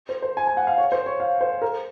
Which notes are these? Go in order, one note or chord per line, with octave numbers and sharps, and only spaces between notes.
C5
C5
G#5
G#5
F#5
F5
C#5
C5
C#5
F5
C5
A#4